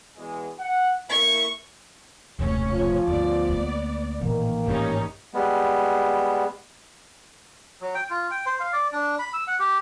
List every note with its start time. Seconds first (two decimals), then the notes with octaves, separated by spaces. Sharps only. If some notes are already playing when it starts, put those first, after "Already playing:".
0.17 E2 B2 G#3
0.60 F#5
1.10 A#3 E4 C#6
2.39 D#1 B1 G#2 C3 A3 C#4
2.71 F3 F4
3.07 D2 G2 B3 D5
3.49 A#3
4.21 A1 A#2 D#3 A#3
4.67 G#2 G3 C#4 D#4
5.34 G3 G#3 B3
7.81 F#3
7.95 G5
8.10 F4
8.31 G5
8.46 C5
8.60 F5
8.73 D5
8.93 D4
9.19 B5
9.34 E6
9.47 F#5
9.60 G4